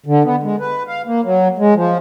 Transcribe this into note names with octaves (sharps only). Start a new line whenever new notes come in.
D3
B3
G#3
B4
F5
A#3
F#3
G#3
F3